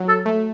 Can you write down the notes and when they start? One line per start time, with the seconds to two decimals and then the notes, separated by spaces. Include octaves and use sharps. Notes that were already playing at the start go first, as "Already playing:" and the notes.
Already playing: F#3
0.09 A4
0.25 A3